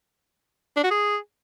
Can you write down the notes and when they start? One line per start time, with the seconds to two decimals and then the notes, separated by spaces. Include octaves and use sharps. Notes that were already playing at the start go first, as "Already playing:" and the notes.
0.77 D4
0.84 F#4
0.91 G#4